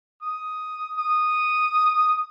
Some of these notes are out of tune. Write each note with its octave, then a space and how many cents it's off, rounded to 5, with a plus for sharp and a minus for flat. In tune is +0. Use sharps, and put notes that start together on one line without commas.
D#6 +5
D#6 -5